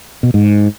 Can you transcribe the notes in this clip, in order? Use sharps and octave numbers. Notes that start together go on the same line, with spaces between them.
B2
G#2